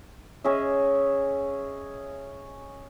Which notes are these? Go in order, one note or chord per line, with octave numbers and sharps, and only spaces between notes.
C#4 G#4 D#5 E5